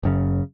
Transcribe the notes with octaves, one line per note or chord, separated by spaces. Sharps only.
F#1 F#2 C#3